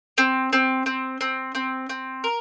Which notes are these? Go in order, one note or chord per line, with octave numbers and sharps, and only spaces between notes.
C4
C4
C4
C4
C4
C4
A#4